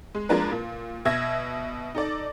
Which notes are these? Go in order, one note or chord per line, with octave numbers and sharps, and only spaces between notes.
G#3
F3 G#3 A#3 D4 A#4 B4
A#2
B2 E5 E6 G#6 A#6
D#4 A4 D5